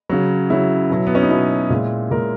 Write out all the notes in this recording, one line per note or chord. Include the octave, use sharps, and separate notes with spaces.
C#3 F#3
C#3 F#3 E4
B2 F#3
B3
C#4
D#4
B2 F#3 E4
A#2 G#3
A#2 G#3 A#4